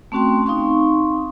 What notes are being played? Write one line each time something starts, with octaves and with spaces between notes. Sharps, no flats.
A3 C4 C#4 F#4 G5 C6
C4 D#4 F5 C6 C#6